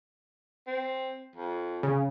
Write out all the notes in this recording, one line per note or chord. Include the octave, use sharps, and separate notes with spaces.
C4
F2
C#3